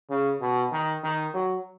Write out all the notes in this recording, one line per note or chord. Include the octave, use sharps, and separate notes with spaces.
C#3
B2
D#3
D#3
F#3